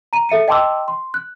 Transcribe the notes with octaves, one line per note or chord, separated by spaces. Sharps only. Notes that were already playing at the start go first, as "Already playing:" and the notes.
A#5 D#7
A4 E5 C#7 D#7
D#5 G5 A5 C6 D6 E6
C6
F#6